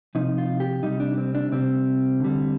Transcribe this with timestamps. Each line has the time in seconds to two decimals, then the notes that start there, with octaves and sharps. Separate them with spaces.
0.15 C3 F3 D#4
0.38 F4
0.60 G4
0.83 C3 G3 D#4
1.00 D4
1.18 C4
1.35 D4
1.52 C3 G3 C4
2.20 D3 G3